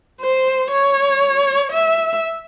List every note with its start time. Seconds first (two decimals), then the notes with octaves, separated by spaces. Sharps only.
0.21 C5
0.71 C#5
1.72 E5